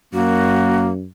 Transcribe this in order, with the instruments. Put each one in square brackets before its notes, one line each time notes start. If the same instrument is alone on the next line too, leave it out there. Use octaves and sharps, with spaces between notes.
[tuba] F#2 [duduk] A#3 [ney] F#4